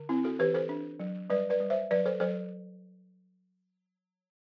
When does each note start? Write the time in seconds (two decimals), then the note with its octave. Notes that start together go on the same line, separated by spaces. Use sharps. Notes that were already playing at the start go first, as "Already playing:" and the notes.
Already playing: D3
0.09 C4 E4
0.24 F#4 A4
0.39 E3 G4 B4
0.54 A4 C5
0.69 D4
1.00 F#3
1.30 G3 B4 D5
1.50 B4 D5
1.60 G3
1.70 C5 E5
1.91 F#3 B4 D5
2.06 A4 C5
2.20 F#3 A4 C5